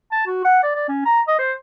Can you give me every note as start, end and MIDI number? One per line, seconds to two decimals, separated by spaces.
0.12 0.23 81
0.27 0.41 66
0.45 0.58 78
0.63 0.71 74
0.75 0.86 74
0.89 1.05 61
1.05 1.21 82
1.27 1.37 75
1.39 1.52 72